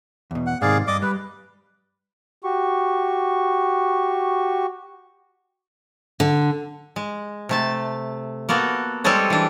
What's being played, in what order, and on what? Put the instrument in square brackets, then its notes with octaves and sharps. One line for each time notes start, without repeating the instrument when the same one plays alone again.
[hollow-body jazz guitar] E2 B2
[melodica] F#5
[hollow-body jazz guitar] G#2 C3 D#3 [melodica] G#4 D5 F5
[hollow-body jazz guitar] G2 [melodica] D5 D#5 D6
[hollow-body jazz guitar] G3 [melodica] B4
[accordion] F#4 G4 C#6
[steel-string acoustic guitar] D3
[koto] G#3
C3 A3 A5
A#3 B3 F#4 A4
G3 G#3 C4 G#4 A4 C#5
E3 D4